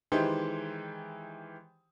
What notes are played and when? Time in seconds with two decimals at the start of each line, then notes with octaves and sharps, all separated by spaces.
0.12 D#3 E3 G#3 G4 C5